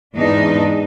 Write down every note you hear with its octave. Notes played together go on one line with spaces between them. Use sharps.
E2 G#2 D4 D#4 D#5